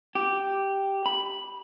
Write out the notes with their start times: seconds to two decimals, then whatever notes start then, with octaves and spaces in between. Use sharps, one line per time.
0.15 G4
1.06 B5